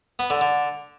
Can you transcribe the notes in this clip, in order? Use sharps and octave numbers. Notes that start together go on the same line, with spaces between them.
B3
D3
D3